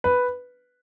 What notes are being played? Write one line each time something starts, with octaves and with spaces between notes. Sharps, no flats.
B4